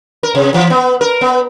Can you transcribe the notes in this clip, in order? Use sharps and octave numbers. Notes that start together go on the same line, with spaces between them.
A#4
C3
E3
B3
A#4
B3